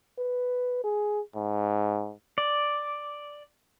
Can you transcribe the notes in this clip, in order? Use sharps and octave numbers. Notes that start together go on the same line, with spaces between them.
B4
G#4
G#2
D5